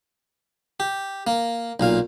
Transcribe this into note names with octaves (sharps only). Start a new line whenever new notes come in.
G4
A#3
B1 A#2 F5